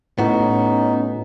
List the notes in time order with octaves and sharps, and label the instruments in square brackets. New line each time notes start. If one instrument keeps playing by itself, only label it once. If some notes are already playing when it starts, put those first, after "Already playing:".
[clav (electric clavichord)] A2 [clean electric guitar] B3 F#4 [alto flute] C#4 [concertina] D#4